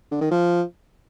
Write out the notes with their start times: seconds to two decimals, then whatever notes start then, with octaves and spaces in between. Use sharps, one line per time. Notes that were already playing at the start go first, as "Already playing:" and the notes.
0.11 D3
0.21 D#3
0.31 F3